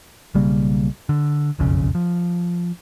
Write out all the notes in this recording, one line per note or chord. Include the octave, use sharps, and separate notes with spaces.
B1 C#3 G3 A#3
D3
F#1 B1 F2 C#3
F3